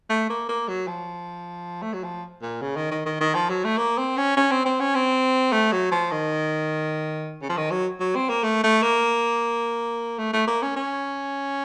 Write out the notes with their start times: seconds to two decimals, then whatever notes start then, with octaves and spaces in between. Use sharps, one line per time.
0.09 A3
0.30 A#3
0.49 A#3
0.68 F#3
0.87 F3
1.82 A3
1.93 F#3
2.04 F3
2.42 A#2
2.62 C#3
2.76 D#3
2.91 D#3
3.06 D#3
3.21 D#3
3.35 F3
3.50 F#3
3.64 A3
3.78 A#3
3.98 C4
4.17 C#4
4.37 C#4
4.51 C4
4.66 C4
4.80 C#4
4.95 C4
5.52 A3
5.72 F#3
5.91 F3
6.11 D#3
7.42 C#3
7.49 F3
7.57 D#3
7.71 F#3
8.00 F#3
8.15 C4
8.29 A#3
8.43 A3
8.64 A3
8.83 A#3
10.18 A3
10.33 A3
10.47 A#3
10.62 C#4
10.76 C#4